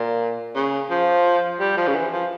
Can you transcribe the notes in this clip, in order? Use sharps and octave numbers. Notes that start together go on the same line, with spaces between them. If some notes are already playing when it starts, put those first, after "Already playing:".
Already playing: A#2
C#3
F3
G3
F3
C#3
E3
F3